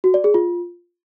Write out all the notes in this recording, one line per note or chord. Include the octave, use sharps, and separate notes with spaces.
F#4
D5
G#4
F4